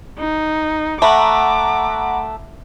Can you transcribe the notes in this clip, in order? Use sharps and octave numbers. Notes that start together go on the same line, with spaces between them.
D#4
A3 F#5 A#5 B5 D6